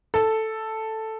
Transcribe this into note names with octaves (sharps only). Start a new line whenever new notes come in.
A4